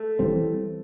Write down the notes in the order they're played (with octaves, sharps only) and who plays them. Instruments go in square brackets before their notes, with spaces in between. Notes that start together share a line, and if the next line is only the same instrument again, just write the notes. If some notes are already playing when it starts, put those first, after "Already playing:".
Already playing: [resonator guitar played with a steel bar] A3
[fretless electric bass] E3 G3 C4